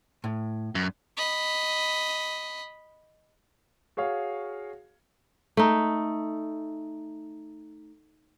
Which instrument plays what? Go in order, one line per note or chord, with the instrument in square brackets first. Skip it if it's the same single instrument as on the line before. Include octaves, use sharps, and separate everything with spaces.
[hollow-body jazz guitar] A2
[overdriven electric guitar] F#2
[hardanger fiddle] D#5 B5
[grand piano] F#4 G#4 C#5 F5
[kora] A3 D#4